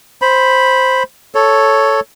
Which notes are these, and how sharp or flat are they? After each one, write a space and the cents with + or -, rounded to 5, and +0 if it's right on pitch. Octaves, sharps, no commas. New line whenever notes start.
C5 +0 B5 +0
A4 +0 C#5 +0